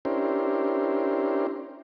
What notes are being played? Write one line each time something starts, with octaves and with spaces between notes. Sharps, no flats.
C#4 D4 E4 G4 A#4 C5